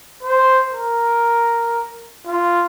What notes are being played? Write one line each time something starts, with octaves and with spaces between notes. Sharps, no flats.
C5
A#4
F4